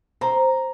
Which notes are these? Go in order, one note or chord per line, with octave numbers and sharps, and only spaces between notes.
C4 A#5